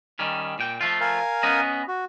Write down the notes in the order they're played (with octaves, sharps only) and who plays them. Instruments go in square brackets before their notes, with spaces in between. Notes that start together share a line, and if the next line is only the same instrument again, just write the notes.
[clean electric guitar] D#3 G3 C#4
A#2 G5
F3 A3 F4
[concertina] A#4 F5 G#5
[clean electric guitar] B3 C#4 D#5
[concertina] F#4